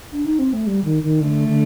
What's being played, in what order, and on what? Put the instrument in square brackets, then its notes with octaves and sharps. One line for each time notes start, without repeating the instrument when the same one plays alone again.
[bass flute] D4
D#4
C4
A3
G3
D#3
D#3
[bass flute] D3 [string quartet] A3
[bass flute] D3